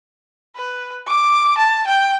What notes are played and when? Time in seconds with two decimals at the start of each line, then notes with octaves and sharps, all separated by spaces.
0.56 B4
1.07 D6
1.57 A5
1.87 G5